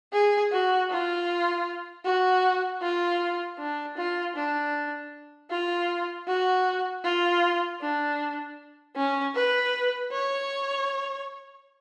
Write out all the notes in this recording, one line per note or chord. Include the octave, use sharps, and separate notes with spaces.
G#4
F#4
F4
F#4
F4
D4
F4
D4
F4
F#4
F4
D4
C#4
B4
C#5